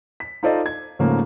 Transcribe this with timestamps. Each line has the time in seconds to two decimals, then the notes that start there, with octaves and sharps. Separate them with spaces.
0.20 B6
0.43 D#4 F4 A4 C5 D5 D#5
0.66 G#6
0.99 G#2 C#3 F3 A3 A#3